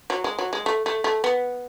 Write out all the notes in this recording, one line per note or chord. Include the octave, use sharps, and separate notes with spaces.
F#3
G#3
F#3
G#3
A3
A3
A3
B3